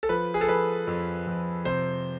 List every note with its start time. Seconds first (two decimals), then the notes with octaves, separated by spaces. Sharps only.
0.03 A4
0.09 F3 B4
0.34 G#4
0.41 A4
0.49 F3 B4
0.87 F2
1.27 F2
1.65 C3 C5